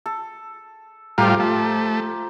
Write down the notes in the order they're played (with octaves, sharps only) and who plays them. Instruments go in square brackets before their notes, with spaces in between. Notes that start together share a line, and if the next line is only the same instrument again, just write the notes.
[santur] A4
[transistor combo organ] A2 G3 F4 [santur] F3 G4 A#5
[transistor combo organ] A3